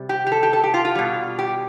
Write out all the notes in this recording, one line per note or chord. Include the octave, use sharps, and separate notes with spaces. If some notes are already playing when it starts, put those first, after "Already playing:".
Already playing: C3 G3
G4
G4
A4
G4
A4
G4
F4
F4
B2 G3
G4